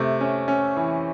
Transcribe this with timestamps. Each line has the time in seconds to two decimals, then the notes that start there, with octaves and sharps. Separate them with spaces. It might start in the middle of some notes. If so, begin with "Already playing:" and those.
Already playing: C3 A3
0.20 C#4
0.48 C#4
0.76 E3